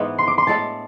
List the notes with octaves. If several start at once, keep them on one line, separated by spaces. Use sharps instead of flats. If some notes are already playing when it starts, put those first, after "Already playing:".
Already playing: G#2 E3 G#3 B3
C6
D6
C6
A2 G#3 D4 A4 A5